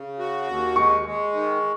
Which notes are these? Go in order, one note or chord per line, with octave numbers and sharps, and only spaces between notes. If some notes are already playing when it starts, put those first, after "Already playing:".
Already playing: C#3
F#4
D#2
G#3 C#6
G#3
D#3